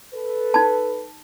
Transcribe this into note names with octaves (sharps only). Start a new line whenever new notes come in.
A4 B4
D#4 A5